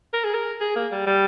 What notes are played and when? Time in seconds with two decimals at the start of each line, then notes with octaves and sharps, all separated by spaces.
0.14 A#4
0.24 G#4
0.34 A#4
0.61 G#4
0.76 A#3
0.92 G3
1.07 G3